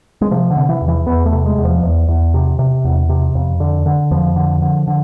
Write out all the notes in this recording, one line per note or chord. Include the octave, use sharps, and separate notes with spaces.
G#3
C3 F3
D3
C3
E3
E2
E3
E2 B3
A3
C3
G#3
E2
F3
E2
E2
C3
C3
E2
C3
F2
D3
D3
F2 F3
D3
D3
D3